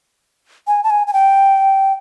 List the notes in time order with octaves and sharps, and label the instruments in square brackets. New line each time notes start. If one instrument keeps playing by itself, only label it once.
[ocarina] G#5
A5
G#5
G#5
G5